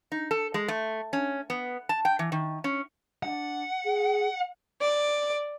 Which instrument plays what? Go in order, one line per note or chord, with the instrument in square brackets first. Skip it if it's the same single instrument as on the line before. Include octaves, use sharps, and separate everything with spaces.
[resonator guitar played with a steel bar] D#4
A4
G#3
A3
C#4
B3
A5
G5
E3
D#3
C#4
[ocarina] D4 [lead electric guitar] F#5
[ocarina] G#4
[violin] D5